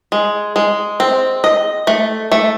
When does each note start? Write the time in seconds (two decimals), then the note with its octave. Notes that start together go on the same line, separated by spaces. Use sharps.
0.12 G#3
0.56 G#3
1.00 C4
1.44 D#5
1.87 A3
2.32 A3